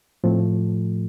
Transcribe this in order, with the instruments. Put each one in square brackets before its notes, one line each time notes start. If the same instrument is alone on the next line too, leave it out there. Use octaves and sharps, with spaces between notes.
[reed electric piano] A2 F3 A3 C4